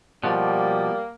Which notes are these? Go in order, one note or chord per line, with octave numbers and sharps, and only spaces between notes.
B2 F3 G3 A#3 F#5 A5